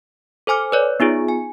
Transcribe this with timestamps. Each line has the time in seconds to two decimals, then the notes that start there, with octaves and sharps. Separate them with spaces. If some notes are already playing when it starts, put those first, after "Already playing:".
0.47 A4 C5 G#5 D6 F6
0.72 B4 C#5 D5
1.00 B3 D#4 F4 G#4
1.28 G#5